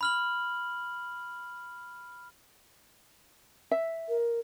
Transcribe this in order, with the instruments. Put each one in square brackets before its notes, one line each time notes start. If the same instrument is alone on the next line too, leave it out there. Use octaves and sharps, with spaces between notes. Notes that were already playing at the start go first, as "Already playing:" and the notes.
[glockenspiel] B5 F6 F#7
[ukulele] E5
[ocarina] A#4